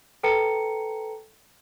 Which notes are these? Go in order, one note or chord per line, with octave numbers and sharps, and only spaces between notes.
A4 B4 G5 A5 A#5 C#7